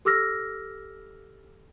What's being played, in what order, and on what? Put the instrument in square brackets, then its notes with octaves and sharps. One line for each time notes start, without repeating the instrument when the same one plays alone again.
[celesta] G4 A4 D6 E6 F6 A#6